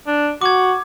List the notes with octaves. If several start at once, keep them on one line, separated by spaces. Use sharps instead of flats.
D4
F#4 D6 G#6